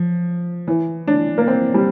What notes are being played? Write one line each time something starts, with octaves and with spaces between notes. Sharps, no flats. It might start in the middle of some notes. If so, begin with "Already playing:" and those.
Already playing: F3
E3
D4
A#3
C4
G3